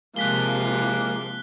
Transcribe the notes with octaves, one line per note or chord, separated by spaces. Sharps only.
C3 F3 G#3 A#3 F#6 B6 G7